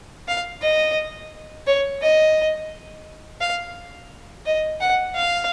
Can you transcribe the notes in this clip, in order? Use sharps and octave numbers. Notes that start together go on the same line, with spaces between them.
F5
D#5
C#5
D#5
F5
D#5
F#5
F5